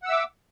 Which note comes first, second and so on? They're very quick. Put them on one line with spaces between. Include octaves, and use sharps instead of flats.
F#5 E6 E5 D6